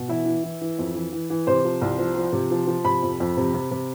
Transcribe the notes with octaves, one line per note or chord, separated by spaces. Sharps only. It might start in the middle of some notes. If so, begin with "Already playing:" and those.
Already playing: B2
E3 E4
E3
E3
E3
F2
E3
E3
E3
C3 C5
F3
C2
F3
F3
C3
F3
F3
C3 B5
F2
F2
C3
C3
C3